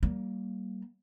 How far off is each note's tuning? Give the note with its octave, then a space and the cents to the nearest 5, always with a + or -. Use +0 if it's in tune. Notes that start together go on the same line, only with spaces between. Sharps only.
G3 -30 A#3 +0